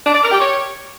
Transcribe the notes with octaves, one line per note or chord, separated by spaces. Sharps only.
D4
D5
A#4
G4
C#5